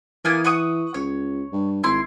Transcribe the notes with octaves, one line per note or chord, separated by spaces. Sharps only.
E3 A#3 B3 G#5
F#5 C#6 D#6
C#2 C#5
G2
G#1 E4 C6